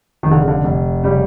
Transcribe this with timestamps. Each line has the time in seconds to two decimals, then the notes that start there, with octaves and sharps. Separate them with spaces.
0.23 F1 D#3
0.31 D3
0.40 C#3
0.48 D3
0.64 F1
1.04 C#3 G3